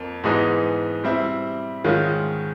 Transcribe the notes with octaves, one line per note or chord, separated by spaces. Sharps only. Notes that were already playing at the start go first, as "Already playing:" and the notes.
Already playing: F2 A#3
G#2 E3 G#3 B3 D#4
G3 C4 E4
G#2 D#3 G#3 C#4 F4